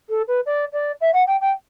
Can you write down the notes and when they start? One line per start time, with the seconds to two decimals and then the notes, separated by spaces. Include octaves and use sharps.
0.09 A4
0.28 B4
0.46 D5
0.73 D5
1.01 E5
1.13 F#5
1.27 G5
1.41 G5